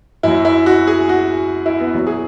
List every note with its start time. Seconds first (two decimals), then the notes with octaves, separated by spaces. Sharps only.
0.23 F#2 F#3 E4
0.45 E4
0.66 F#4
0.87 G#4
1.09 F#4
1.66 E4
1.80 B3
1.94 E2 B2 F#3
2.07 G#4